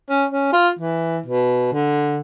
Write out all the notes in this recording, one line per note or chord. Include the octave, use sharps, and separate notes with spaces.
C#4
C#4
F4
E3
B2
D3